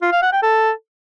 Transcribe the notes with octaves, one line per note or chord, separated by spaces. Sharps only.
F4
F5
F#5
G5
A4